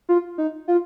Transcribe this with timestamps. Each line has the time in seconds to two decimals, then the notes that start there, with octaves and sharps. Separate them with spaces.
0.09 F4
0.38 D#4
0.68 F4